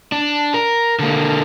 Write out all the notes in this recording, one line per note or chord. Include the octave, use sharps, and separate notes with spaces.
D4
A#4
D3 A#3